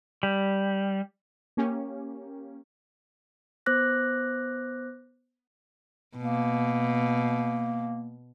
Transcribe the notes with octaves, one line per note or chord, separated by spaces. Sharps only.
G3
A#3 C#4 G4
B3 C5 D6 F#6 A#6
B2 A#3